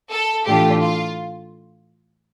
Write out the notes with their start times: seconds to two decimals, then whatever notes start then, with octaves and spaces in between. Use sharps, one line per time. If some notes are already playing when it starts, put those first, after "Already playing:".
0.12 A4
0.47 A2 E3 A3 D4 F4 G4
0.83 F4